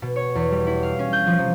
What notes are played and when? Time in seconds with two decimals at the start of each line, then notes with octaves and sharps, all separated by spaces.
0.02 B2
0.16 C#5
0.35 E2
0.52 G3
0.67 E4
0.83 F5
0.99 C#4
1.13 G6
1.27 F3
1.39 C3